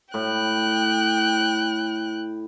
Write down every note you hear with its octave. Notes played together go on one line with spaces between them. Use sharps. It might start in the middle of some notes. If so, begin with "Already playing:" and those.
A2 G5 F#6